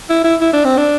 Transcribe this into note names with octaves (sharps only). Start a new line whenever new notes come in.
E4
E4
E4
D4
C4
D4